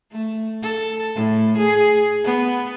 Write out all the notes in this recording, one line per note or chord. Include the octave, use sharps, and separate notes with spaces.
A3
A4
A2
G#4
B3